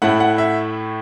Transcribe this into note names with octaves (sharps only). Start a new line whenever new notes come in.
A2 A3 E4 F#5
F#5
E5